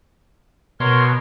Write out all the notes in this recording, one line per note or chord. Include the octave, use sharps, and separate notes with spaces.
B2 A#4 C#5 C6